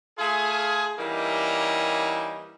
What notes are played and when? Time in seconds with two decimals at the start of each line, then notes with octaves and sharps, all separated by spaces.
0.18 A3 F4 G#4
0.98 E3 G3 A#3 C#4 D#4